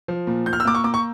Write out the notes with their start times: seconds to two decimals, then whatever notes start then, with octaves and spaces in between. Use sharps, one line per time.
0.08 F3
0.27 A#2
0.46 A#2 G6
0.53 F6
0.60 E6
0.65 A#3 D6
0.74 C#6
0.84 A#3 D6
0.94 C#6